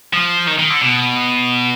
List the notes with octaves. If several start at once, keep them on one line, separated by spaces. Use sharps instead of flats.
F3
D#3
D#3
D3
B2